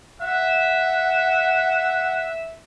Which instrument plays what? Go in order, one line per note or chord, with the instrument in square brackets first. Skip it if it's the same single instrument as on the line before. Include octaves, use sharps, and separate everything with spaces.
[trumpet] E5 [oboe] F#5